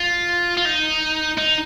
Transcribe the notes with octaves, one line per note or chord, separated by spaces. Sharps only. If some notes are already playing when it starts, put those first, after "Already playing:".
Already playing: F4
F4
D#4
D#4